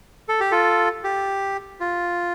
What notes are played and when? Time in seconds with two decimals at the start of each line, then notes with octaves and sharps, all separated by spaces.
0.29 A4
0.40 G4
0.51 F4 A4
1.04 G4
1.80 F4